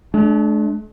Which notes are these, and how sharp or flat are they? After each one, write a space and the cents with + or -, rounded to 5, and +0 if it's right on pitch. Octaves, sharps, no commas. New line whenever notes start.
A3 -45 D4 +0